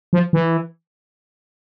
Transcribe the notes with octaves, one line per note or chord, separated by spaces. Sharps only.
F3
E3